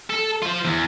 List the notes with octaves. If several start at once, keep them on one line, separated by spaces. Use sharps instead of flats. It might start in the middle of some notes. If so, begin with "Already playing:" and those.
A4
F4 C5
E2